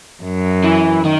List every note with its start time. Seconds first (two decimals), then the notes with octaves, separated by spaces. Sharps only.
0.23 F#2
0.64 E3
1.04 D#3